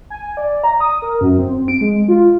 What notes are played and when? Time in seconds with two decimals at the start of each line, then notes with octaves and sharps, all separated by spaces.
0.10 G#5
0.37 D5
0.64 A#5
0.80 D#6
1.02 A#4
1.21 F#2
1.39 C4
1.68 D7
1.81 G#3
2.08 F4